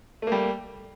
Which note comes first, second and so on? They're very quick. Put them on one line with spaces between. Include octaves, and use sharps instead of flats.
A3 A#3 G3